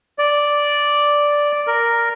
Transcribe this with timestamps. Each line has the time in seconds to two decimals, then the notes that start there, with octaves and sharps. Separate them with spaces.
0.19 D5
1.67 A#4